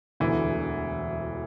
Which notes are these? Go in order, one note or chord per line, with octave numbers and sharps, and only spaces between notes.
E1 D2 D3 E3